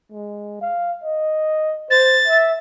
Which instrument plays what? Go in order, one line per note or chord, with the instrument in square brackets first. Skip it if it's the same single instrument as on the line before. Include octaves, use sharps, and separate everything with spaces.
[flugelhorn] G#3
F5
D#5
[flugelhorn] C5 [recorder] A6
[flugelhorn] E5